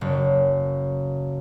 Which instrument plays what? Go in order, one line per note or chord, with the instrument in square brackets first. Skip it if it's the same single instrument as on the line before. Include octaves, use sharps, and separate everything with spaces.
[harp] F#1